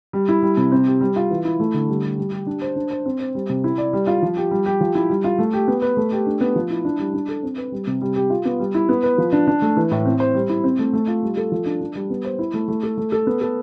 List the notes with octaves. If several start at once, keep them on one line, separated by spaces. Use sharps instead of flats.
G3
E4
G3
C3
C4
G4
G3
F4
E3
E4
A3
D3
G3
G4
G3
G4
D4
C5
D4
C5
C4
C5
G3
C3
E4
D5
G3
F4
F3
G4
G3
G4
F3
E4
G3
F4
A3
G4
B3
B4
A3
G4
D4
B3
F3
E4
D4
G3
D4
A4
C4
B4
G3
C3
G3
G4
F4
B3
G3
E4
B3
B4
F3
D4
D4
A3
E3
A2
C4
C5
G3
E4
C4
A3
A3
F4
G3
A4
F3
D4
D4
G3
B3
C5
E4
A3
A3
A4
A3
A4
B3
A4